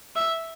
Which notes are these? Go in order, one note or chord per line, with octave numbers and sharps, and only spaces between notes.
E5